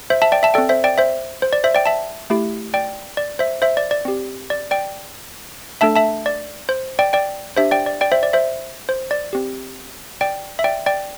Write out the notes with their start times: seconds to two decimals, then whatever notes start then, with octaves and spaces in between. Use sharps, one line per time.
0.10 C5 E5
0.22 E5 A5
0.32 D5 G5
0.43 E5 A5
0.54 C4 A4 D5 G5
0.69 C5 E5
0.84 D5 G5
0.98 C5 E5
1.42 C5
1.53 D5
1.64 C5 E5
1.75 D5 G5
1.86 E5 A5
2.30 A3 E4 G4
2.74 D5 G5
3.17 D5
3.39 C5 E5
3.62 C5 E5
3.77 D5
3.91 D5
4.05 C4 G4
4.50 D5
4.71 D5 G5
5.81 A3 D4 A4 E5 A5
5.96 E5 A5
6.26 D5
6.69 C5
6.99 D5 G5
7.13 D5 G5
7.56 D4 G4 C5 E5
7.71 D5 G5
7.86 D5
8.01 D5 G5
8.12 C5 E5
8.23 D5
8.33 C5 E5
8.89 C5
9.11 D5
9.33 C4 G4
10.21 D5 G5
10.59 E5
10.64 D5 G5
10.86 D5 G5